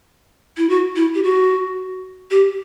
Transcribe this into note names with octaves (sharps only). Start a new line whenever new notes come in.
E4
F#4
E4
G4
F#4
G4